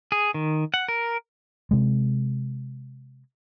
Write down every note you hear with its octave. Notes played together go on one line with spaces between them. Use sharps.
G#4
D#3
F#5
A#4
C3 G#3